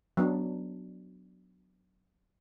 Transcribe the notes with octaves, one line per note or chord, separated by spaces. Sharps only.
F#3 B3 D4